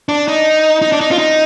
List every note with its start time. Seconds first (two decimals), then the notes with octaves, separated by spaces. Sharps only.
0.09 D4
0.28 D#4
0.82 D#4
0.92 D4
1.01 D#4
1.11 F4
1.18 D#4